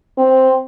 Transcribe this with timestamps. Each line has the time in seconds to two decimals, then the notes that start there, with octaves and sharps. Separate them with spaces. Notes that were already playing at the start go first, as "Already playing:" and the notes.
0.18 C4